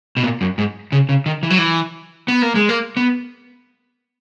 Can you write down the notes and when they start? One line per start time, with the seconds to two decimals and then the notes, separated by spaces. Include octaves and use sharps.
0.17 B2
0.23 A#2
0.41 F#2
0.58 G#2
0.92 C#3
1.09 C#3
1.26 D#3
1.43 E3
1.50 F#3
1.58 E3
2.28 B3
2.42 A#3
2.55 G#3
2.69 A#3
2.97 B3